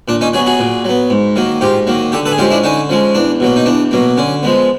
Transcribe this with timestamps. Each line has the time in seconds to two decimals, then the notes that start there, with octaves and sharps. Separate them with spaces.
0.08 A#2 D4
0.21 C#4 D#4
0.33 F#3 F#4 G#4
0.37 B3
0.46 F#4 G#4
0.59 A#2
0.85 F#3 B3
1.10 G#2
1.36 D#3 F#3 A#3
1.61 G#2 F4 G4
1.87 D#3 F#3 A#3
2.12 D3 G4 A4
2.26 A4 B4
2.32 G#4
2.38 F3 G#3 C#4 F4 G4
2.50 D4 E4
2.63 D3 C#4 D#4
2.89 F3 G#3 C#4
3.15 E2 D4
3.40 B2 F#3 A#3
3.56 D#4
3.66 E2 D4
3.91 B2 F#3 A#3
4.17 D3 C#4
4.43 F3 G#3 B3